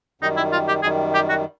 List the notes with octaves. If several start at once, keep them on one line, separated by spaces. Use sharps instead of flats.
F#2 D#3 G3 D#4
E4
F4
G4
F#2 D#3 G3 G#4
G4
F#4